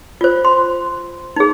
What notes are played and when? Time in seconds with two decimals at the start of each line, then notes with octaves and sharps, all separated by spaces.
0.21 F4 C5
0.45 C6
1.36 D#4 G#4